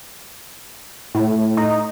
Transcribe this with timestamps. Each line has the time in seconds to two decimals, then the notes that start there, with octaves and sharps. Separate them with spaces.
1.15 A2
1.57 D#4